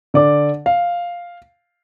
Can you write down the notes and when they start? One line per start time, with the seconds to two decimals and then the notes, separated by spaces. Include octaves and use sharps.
0.14 D3 D5 D6
0.66 F5